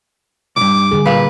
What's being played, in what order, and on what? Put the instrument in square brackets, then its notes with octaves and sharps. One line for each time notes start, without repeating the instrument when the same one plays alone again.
[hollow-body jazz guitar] C2 G2 [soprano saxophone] D6
[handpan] D3 G3 G#4
[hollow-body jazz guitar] A#2 F5 [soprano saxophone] B4